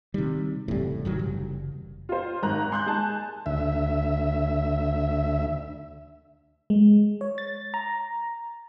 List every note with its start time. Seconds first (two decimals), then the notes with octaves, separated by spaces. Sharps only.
0.14 C3 D#3 G3
0.68 F#1 A2 C3 E3 G3
1.05 G#1 D#3 F#3
1.19 F#1
2.09 F4 C5
2.43 G#1 A#5 F#6
2.71 G#5 C6 F#6 G6
2.86 G#3 G#5 A5
3.46 D2 E5
6.70 G#3
7.21 C#5
7.38 A6
7.74 A#5